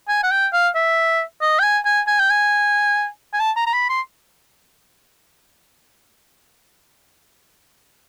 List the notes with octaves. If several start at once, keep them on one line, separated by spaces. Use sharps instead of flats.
G#5
F#5
G5
F5
E5
D#5
G5
G#5
G#5
G#5
G5
G#5
G#5
A5
A#5
A#5
B5
C6